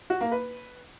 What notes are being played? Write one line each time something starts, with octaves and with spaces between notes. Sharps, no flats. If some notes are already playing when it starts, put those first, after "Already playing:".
F#4
A#3
B4